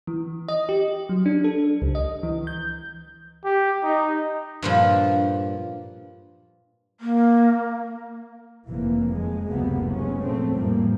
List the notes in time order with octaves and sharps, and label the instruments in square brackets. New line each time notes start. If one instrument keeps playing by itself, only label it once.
[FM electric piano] E3
D#5
G4
F#3
D4
A4
C#2
D#5
E3
G6
[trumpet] G4
D#4
[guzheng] G2 A#2 F3
[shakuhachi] A#3
[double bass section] F1 E3 A#3
F2 G#3
F#1 D2 C3 A#3 B3
G#3 B3 C#4
A#2 F3 A3 C4
F2 A2 E3 F3 G3 A#3